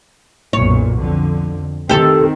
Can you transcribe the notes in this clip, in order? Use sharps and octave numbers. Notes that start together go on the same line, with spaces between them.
B1 F#2 A#2 C#5
F2 D3
D#3 C4 G4 A4